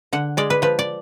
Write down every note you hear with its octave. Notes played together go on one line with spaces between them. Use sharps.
D3 F#5
G#3 D5
B4
F3 B4
D5